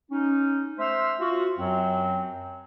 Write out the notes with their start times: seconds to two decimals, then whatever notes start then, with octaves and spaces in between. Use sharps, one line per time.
0.11 C#4 D#4
0.79 A3 C5 E5 C6 E6 F6
1.20 F4 F#4
1.58 F#2 F#3 C4